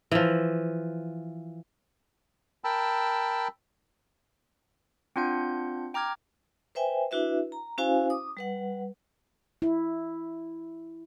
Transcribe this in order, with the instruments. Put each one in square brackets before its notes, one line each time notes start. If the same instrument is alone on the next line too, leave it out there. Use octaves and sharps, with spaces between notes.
[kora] E3 F3
[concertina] A#4 G5 A5 B5 E6
[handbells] C4 D4 F4 F#5 G6
G5 A#5 D6 F6 G#6
[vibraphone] B4 C5 E5 G5 G#5
D4 E4 F#4 B4 E5
A#5
C#4 E4 F#4 C5 F5 G#5
D6 D#6
G3 B4 F#5
[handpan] E4